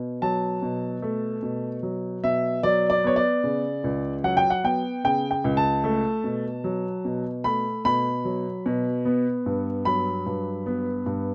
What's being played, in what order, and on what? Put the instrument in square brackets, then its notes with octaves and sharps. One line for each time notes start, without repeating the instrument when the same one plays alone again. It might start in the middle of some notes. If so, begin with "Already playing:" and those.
Already playing: [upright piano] B2
F#3 A5
B2
A3
B2
F#3
B2 E5
F#3 D5
D5
B3 C#5
D5
C#3
C#2
F#3 F#5
G5
F#5
B3 G5
C#3 G5
G5
C#2
A5
A3
B2
F#3
B2
A3 B5
B2 B5
F#3
B2
B3
G2
F#3 B5
G2
B3
G2